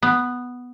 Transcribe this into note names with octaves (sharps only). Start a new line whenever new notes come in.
B3